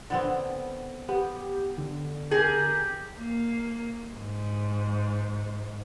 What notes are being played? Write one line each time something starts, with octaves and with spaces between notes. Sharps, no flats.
D3 B3 C4
B3 G4
D3
G4 G#4 A#4
A#3
G#2